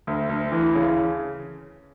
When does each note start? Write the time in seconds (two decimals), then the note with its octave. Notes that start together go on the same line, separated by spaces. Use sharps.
0.07 D2
0.29 D2
0.52 E3
0.75 C#3